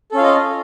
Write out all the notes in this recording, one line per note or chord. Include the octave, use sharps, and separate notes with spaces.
C#4 F4 A4 D#5 F5